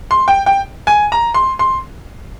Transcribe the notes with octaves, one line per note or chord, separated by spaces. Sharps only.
C6
G5
G5
G#5
A#5
C6
C6